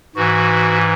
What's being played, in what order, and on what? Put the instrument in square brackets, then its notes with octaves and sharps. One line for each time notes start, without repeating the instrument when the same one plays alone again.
[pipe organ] G#2 E3 F#4